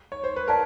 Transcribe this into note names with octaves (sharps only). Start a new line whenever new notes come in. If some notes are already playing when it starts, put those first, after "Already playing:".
C#5
C5
B4
A#4 D5 F5 A5